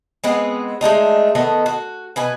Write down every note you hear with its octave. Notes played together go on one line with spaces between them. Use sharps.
G#3 B3 C4
G#3 A3 D4 D#4
D#3 B3 A4 D#5
F#4
B2 B4 G#5